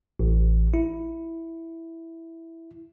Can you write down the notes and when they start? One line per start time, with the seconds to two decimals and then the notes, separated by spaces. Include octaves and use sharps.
0.19 A1
0.74 E4